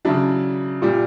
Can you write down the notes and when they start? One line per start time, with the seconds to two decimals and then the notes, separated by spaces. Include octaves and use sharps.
0.05 C#3 F#3 D4 E4
0.82 A#2 G3